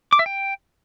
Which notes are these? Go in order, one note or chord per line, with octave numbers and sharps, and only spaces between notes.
D6
E5
G5